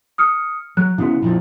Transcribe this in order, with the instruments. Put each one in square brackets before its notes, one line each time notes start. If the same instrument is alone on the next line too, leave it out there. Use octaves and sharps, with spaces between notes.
[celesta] D#6 F6 C#7
[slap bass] F#3 [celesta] F#6
[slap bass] C#3 B3 [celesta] E4 F#4
[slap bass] A#1 F2 A#2